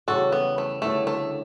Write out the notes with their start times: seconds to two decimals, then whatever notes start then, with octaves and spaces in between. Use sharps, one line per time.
0.08 E2 C#3 G3 F#4 A4
0.32 B3
0.58 A3
0.82 D2 C#3 G3 A3 B3 E4
1.07 A3